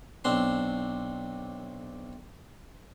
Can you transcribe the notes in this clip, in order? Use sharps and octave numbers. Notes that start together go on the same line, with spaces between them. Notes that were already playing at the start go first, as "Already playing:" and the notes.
B1 C4 D4 C6